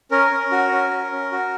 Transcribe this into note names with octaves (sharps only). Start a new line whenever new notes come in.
C#4 A#4
C#4
F#4
C#4
C#4
C#4
F#4